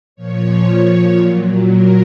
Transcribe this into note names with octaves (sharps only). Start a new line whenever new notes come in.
A#2 F3 C#5
A#2 F#3
A#4